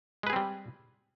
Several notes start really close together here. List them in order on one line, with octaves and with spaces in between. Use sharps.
G#3 B4 G#4 C4 G3